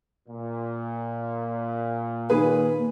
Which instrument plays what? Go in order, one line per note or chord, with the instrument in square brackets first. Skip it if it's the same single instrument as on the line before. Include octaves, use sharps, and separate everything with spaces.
[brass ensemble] A#2
[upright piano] D#3 G#4 B4 [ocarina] A#3